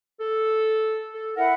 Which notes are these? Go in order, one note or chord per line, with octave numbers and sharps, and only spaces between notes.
A4
A4
E4 A#4 E5 F#5